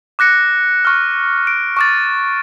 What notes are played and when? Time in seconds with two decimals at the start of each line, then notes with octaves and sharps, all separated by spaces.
0.19 D6 F#6 A#6 C#7
0.85 C#6 F6
1.47 D7
1.77 C#6 D6 A6